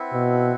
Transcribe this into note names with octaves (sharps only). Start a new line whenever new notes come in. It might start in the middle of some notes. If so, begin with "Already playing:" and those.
Already playing: C4 E4 B4 F#5
B2